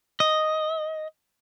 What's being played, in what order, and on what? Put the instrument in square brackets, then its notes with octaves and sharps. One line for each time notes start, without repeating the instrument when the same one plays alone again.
[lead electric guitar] D#5